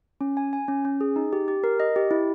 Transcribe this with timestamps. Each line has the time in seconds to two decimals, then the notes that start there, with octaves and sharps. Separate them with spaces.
0.21 C#4
0.37 G#5
0.53 G#5
0.68 C#4
0.85 C#4
1.01 G#4
1.16 D#4
1.33 G4
1.48 G4
1.64 A#4
1.80 D#5
1.96 G4
2.11 E4